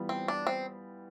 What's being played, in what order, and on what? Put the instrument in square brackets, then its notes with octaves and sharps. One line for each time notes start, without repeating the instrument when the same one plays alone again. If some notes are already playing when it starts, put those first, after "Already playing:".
Already playing: [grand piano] E3 G3 B3 F4
[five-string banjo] C4
D4
C4